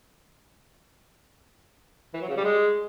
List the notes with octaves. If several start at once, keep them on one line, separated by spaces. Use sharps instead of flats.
E3
F#3
C#3
G3
G#3